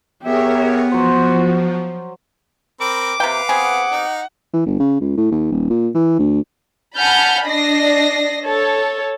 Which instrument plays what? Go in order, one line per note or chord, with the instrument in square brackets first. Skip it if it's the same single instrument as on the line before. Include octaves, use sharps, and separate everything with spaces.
[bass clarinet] B3 [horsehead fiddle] G4 E5 [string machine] G#4 A#4 C#5
[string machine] F3 [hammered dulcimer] F#3 C5 [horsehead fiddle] F#4
[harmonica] C4 A#4 B5 [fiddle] D6
[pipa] C3 A#3 G5 [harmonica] B4 F5
[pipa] B3 C4 G#4 [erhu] F#5
[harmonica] D#4
[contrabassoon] E3
G1
C#3
C#2
A2
D#2
D#1
A#2
E3
D2
[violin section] F#5 G#5 A5 B5 F6 G6
D4 D5 D#5 A#6 C7
A4 C#5